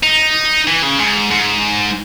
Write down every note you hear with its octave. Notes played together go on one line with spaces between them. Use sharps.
D#4
E3
C#3
G#2
G#2